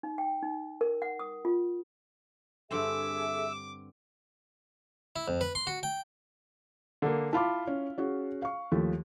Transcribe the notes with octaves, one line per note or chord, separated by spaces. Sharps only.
D#4
G5
D#4
A#4
F#5
D#6
F4
G2 D3 C4 G#4 A4 E5 D6 E6
E4
F2
B4
C6
F#4
G5
D3 A#3
E4 F4 A5 B5 D6
C#4
C#4 F#4 G#4
F5 C#6
D#2 F3 A3